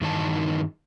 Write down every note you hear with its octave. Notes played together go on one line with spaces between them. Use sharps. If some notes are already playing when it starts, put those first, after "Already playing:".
G2 D#3 E3 D#4 A5